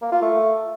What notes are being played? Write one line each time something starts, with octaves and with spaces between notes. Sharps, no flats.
A#3
F4
A3